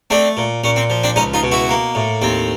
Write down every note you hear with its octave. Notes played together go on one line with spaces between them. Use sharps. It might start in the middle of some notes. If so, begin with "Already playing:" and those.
A3 C4 D4
A#2
A#2 C#4
C4
F3
C4 D4
C#2 C#4 D#4
D#4 F4
B2
E4 F#4
A#3
A2
D#2 C4